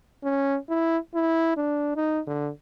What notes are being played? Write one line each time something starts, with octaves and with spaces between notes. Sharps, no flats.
C#4
E4
E4
D4
D#4
D3